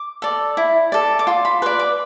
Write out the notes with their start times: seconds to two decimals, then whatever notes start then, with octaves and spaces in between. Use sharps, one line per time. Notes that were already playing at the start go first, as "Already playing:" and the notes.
Already playing: D6
0.22 A4 D5
0.57 E4
0.92 A4 D5
1.19 D6
1.27 F4 C6
1.45 B5
1.62 B4 D5 C6
1.79 D6